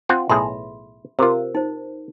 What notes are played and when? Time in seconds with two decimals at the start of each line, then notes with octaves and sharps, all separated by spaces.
0.09 C4 F4 F#5
0.29 B1 A2 G#4 E5 B5 C6
1.19 C3 F4 A#4 C5 E6
1.55 D#4 C5